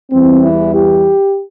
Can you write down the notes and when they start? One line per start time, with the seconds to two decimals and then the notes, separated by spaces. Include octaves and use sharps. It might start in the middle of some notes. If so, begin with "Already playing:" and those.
0.11 E2 E3 G3 C4
0.43 E4
0.74 G4